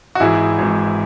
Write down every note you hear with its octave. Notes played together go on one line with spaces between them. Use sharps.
F#4
G#1 G#2 E3 E4 G#4
G#1 G#2 E3